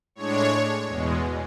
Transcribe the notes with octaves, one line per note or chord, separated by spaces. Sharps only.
A2 G#3 D4 C#5
E2 B2 G#3